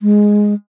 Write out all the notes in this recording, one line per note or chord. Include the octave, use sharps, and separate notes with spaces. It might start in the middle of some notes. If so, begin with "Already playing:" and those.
G#3